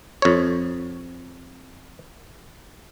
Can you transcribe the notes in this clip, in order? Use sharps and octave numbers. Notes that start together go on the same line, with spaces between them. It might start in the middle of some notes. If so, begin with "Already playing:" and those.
F2 C#5